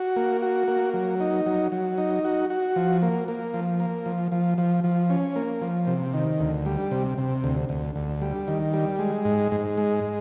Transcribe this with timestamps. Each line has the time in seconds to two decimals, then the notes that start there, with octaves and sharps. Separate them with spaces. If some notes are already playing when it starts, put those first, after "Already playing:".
Already playing: F#4
0.16 A#3
0.42 F#4
0.68 A#3
0.94 F#3
1.20 D#4
1.46 F#3
1.72 F#3
1.98 D#4
2.24 F#4
2.50 F#4
2.76 F3
3.02 A#3
3.28 A#3
3.54 F3
3.80 A#3
4.06 F3
4.32 F3
4.58 F3
4.84 F3
5.10 C#4
5.36 A#3
5.61 F3
5.87 C3
6.14 D#3
6.40 D2
6.66 G3
6.91 C3
7.18 C3
7.44 D2
7.69 D2
7.95 D2
8.21 G3
8.48 D#3
8.73 G3
8.99 G#3
9.25 G#2
9.52 G#2
9.78 G#3